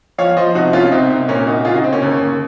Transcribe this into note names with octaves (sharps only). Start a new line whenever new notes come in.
F3 C#5 F5
F3 C5 D#5
C2 D#4 F#4
C2 C#4 F4
C2 C4 D#4
C2
A#2 A#3 C#4
C2 D#4 F#4
C#3 F4 G#4
D#4 F#4
C#3 C4
A#3 C#4
D#2
D#2